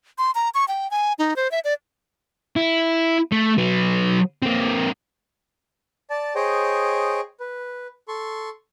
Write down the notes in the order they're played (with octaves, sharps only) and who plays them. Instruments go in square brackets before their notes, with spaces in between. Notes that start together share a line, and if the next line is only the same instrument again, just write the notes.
[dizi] C6
A#5
C#6
G5
G#5
D#4
C5
E5
D5
[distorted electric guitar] E4
A3
F#3 B4
A#3 C4
[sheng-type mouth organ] D5 A5
G#4 C5 C#5 D#5 G5
B4
A4 C6 C#6